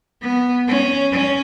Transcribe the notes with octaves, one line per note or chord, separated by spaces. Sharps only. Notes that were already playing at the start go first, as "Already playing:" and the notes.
B3
C#4
C#4